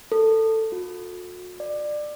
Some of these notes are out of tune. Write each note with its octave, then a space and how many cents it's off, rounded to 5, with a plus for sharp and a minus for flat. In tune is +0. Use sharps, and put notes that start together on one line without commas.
A4 +15
F#4 -45
D5 +20